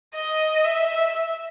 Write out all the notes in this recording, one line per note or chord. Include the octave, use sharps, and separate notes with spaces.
D#5
E5